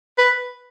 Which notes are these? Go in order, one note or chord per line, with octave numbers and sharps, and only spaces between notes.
B4